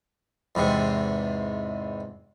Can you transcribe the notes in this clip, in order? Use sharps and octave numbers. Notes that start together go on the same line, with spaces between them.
E2 G#2 C3